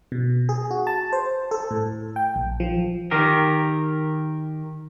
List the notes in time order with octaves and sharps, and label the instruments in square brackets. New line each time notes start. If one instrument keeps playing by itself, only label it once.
[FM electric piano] B2
G#4
F#4
A5
C5
A4
A2
G5
A#1
F3
[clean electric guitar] D#3 G4 A#4